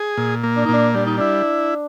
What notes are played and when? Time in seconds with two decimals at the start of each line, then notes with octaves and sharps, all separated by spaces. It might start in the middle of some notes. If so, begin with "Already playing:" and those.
Already playing: G#4
0.18 A#2
0.43 A#3
0.56 D4
0.65 D#4
0.69 A#2 D4
0.95 G3 D4
1.06 D#4
1.17 D4 E4